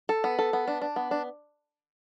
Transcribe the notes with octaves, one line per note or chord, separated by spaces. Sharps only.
A4
B3
A4
B3
D4
D4
B3
D4